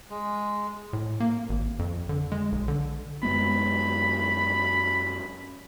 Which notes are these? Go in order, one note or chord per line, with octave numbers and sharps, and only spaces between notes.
G#3
A2
A#3
G#1
F2
D3
G#3
B1
D3
F#2 G#3 B3 B5